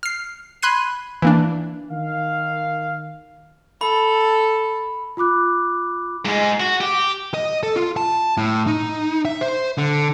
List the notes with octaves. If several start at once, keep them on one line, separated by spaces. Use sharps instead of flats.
F6 C7
B5 C6 F#6 G#6 C7 D#7
E3 A#3 D4
D#3 F5
A4 B5
F4 B5 D6 F#6
G#2 G#3
F#4
G4
D#5
A4
F4
A5
A2
D#4
E5
C5
D3